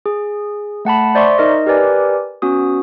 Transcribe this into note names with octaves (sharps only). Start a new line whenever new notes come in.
G#4
A3 F#5 A5 B5
C5 D5 E5 C6 C#6
D#4 A#4 D#5
G4 A#4 B4 D5 G#5
B3 C#4 F#4 D#6